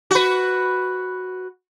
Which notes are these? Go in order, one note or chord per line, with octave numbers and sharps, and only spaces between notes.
F#4 B4